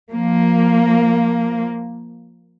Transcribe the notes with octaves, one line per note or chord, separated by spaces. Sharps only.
F3 A#3